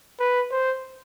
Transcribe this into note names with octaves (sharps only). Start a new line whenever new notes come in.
B4
C5